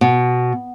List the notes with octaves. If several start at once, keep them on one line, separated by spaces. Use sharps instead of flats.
B2